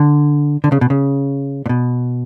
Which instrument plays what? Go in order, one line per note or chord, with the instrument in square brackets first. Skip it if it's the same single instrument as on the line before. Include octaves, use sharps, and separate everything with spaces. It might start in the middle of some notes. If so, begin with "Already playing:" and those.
Already playing: [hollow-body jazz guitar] D3
D3
C#3
B2
C#3
A#2
B2